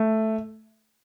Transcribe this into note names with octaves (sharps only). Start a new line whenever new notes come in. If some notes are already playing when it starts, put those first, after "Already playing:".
Already playing: A3